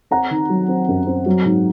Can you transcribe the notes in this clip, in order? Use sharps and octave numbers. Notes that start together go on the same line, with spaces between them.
C4 F#5 A#5
D#3
F#3
C4
F#2
C4
F#3
G#2